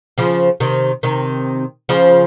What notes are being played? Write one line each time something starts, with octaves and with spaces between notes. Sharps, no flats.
C#3 F3
C3 D#3
C3 D#3
C#3 F3